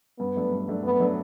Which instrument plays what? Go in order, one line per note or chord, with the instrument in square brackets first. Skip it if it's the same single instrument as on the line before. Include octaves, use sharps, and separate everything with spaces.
[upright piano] G2 [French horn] B3
[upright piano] F#3 A3 D4
G2
F#3 A3 D4
[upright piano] G2 [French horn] B3
[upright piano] F#3 A3 D4